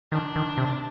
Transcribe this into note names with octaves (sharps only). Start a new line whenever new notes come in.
D#3 D4
D#3
C3